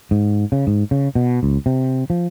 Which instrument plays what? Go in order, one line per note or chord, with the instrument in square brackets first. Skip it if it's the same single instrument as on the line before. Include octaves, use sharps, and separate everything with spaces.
[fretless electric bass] G#2
C#3
G#2
C#3
B2
C#2
C3
F3